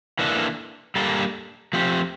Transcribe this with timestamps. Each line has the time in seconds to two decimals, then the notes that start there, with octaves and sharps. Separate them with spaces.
0.19 E3 A#3 D4 A4
0.96 G3 A#3 D4 A4
1.73 F3 A3 C4 G4